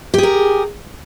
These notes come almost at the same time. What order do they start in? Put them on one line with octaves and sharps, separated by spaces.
G4 G#4 A#4